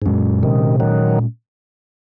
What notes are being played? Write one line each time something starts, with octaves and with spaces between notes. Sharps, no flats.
G#2
F#2 A#2 G#3 C#4
C3 D#3
D#3 F#3